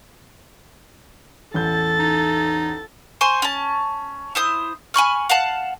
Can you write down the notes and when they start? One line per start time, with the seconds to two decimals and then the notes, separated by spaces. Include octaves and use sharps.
1.54 A1 E2 A4 G6 A6
1.99 D#4
3.21 C5 G#5 C6 C#6
3.42 C#4 A5
4.35 E4 C5 D#6
4.94 G#5 B5 C#6 F6
5.29 F5 F#5 A5